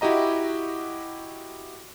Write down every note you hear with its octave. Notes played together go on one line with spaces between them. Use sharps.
E4 F#4 G4 D#5 A#5